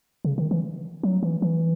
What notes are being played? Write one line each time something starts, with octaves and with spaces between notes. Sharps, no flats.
C#3
D#3
E3
F#3
E3
E3